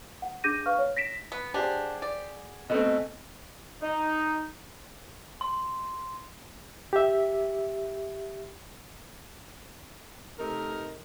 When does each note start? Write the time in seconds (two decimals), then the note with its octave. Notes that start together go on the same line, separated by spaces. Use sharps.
0.22 F#5
0.44 D4 G#4 D6 G6 A#6 D#7
0.66 B4 F5 C#6 F6
0.79 C#5
0.97 A#6 B6 D7 E7
1.32 B3
1.54 D4 G4 G#4 C5 F#5
2.02 D5
2.70 B2 A3 C4 D#5
3.82 D#4
5.41 C6
6.93 G4 E5
10.39 C3 A3 D#4 A#4